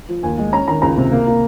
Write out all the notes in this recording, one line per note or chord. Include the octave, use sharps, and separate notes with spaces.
F3
D#2 G#5
G#3
C#4 A#5
D#3 A#5
C#2 A#5
C3
A#3
A#3